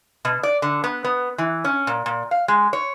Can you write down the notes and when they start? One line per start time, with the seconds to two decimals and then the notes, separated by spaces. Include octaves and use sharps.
0.25 B2
0.43 D5
0.62 D3
0.84 B3
1.04 B3
1.38 E3
1.65 C#4
1.87 A#2
2.06 A#2
2.31 F5
2.48 G#3
2.73 C#5